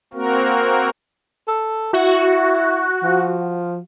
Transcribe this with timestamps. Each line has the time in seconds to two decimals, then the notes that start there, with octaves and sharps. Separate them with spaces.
0.13 A#3 C4 F#4 A#4
1.48 A4
1.93 E4 F#4
3.03 F3